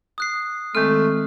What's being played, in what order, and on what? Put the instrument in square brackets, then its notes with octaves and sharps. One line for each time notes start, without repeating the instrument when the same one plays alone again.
[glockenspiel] D#6 F#6 C7
[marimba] D#3 G#3 C4 [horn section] A3 [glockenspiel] F6